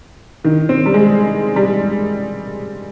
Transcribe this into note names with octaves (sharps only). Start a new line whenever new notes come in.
D#3
C4
G3
G#3
G3